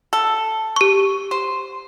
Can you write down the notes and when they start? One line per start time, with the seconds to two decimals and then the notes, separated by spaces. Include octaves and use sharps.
0.13 A4
0.76 G4 C#6
1.31 C5